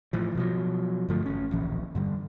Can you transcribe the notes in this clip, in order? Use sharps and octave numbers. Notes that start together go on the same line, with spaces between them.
A2 E3 F3
B2 F3 F#3
G2 D3 F3 A3
A1 C#4
D1 A#1 E3
G2 D3 G3